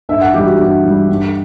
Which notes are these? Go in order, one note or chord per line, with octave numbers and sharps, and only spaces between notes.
G2 E5
F#5
E3 G3 G4
F#4
G2 G4
E3 G3
G2